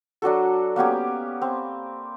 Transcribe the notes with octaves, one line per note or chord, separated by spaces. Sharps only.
F#3 D4 F#4 A4
A#3 B3 C#4 G4
C4